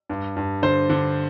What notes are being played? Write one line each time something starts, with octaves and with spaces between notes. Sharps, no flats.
G2
G2
D3 C5
D3